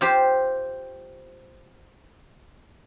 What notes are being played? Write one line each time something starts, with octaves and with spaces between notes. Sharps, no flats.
F4 G4 C5